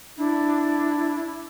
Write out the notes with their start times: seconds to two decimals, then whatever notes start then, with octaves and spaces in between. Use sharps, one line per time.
0.18 D4 E4